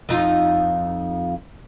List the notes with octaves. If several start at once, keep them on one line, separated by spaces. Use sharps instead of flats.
F2 D#4 F4